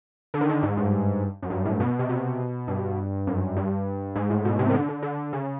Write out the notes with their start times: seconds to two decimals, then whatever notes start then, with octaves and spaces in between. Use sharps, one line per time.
0.34 D3
0.41 D#3
0.49 D3
0.63 G#2
0.77 G2
1.43 F#2
1.50 G2
1.65 A2
1.80 B2
1.99 C3
2.09 B2
2.68 G2
3.27 F#2
3.57 G2
4.16 G#2
4.30 A2
4.45 B2
4.59 C3
4.70 D#3
4.74 D3
4.89 D3
5.03 D3
5.33 C#3